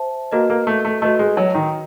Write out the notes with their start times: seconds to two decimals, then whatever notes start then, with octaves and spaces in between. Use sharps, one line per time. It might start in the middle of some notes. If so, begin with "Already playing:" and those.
Already playing: C5 E5 A5
0.31 A#3 F#4 B4 D#5
0.50 A#3
0.67 A3
0.85 A3
1.02 A3 F#4 B4 D#5
1.19 G#3
1.37 F#3
1.55 D#3